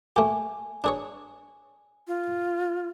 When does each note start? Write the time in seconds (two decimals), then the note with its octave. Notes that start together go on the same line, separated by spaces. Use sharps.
0.16 A3 G4 G#5
0.84 D4 G#4 C#5
2.07 F4